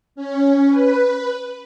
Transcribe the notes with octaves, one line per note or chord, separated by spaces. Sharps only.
C#4
B4